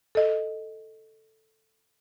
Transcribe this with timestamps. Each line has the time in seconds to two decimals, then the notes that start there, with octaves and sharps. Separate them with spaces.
0.15 A4 D#5